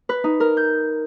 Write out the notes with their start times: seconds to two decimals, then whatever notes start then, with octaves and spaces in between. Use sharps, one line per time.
0.09 B4
0.24 D#4
0.40 A#4
0.57 G6